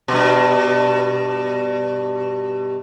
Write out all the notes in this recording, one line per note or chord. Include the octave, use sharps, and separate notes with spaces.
G2 B2